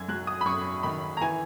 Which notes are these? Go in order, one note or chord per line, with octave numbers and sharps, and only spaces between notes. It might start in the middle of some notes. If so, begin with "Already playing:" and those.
Already playing: F#2 G#6
F#3 F#6
D#6
B5
F#2 C#6
D#3 B5
A#5
E3 G#5